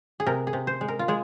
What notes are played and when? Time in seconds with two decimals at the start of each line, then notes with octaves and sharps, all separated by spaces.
0.20 G#4
0.26 C3 A#4
0.47 G#4
0.53 C3
0.67 C5
0.81 G#3
0.88 A#4
0.99 F4
1.08 G#3 G#4